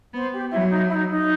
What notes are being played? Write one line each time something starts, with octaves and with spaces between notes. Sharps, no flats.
B3 C5
G4
F#3 E4
D#4
E4
D#4
D#4